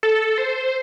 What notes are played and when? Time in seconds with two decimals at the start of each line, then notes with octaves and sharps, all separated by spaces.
0.03 A4
0.38 C5